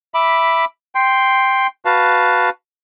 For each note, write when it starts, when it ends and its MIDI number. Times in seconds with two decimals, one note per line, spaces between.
0.14 0.65 76
0.14 0.65 83
0.14 0.65 86
0.95 1.67 79
0.95 1.67 84
1.85 2.49 66
1.85 2.49 71
1.85 2.49 77
1.85 2.49 81